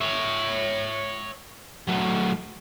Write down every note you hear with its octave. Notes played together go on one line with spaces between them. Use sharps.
C#5 E5
F#3 A3